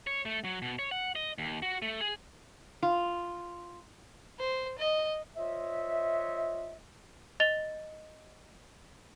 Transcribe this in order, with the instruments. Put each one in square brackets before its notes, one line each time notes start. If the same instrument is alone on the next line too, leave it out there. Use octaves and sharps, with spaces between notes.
[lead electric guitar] C#5
A3
F#3
B2
C#5
F#5
D#5
D#2
F#4
A3
G#4
[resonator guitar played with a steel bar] F4
[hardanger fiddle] C5
D#5
[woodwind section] F4 C5 C#5 D#5 E5
[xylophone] D#5 A6 F7 G7